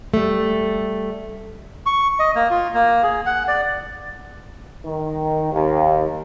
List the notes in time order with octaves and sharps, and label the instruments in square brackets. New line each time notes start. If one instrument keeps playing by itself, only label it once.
[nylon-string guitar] G3 A3
[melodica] C#6
D#5
A#3
F4
A#3
G#4
F#5
D5
[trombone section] D#3
D#2